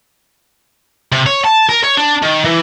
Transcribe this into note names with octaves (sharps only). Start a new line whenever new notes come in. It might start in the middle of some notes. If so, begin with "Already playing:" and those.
C3
C#5
A5
A#4
C#5
D4
D#3
E3